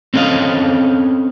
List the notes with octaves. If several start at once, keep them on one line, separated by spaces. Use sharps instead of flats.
C4 C#4 A4 D#5 F5